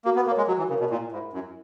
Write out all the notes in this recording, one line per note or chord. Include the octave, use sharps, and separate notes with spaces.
A#3 F#4
B3
A#3 A#4
C#5
G#3
F#3 F#4
E3
C#3 A#4 C#5
B2
A#2 E4
G#2 A#4 E5 B5
F#2 E4